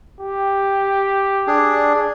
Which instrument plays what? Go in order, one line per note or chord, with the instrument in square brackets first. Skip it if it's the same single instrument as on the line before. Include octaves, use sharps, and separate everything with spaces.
[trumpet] G4
[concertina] D4 G#4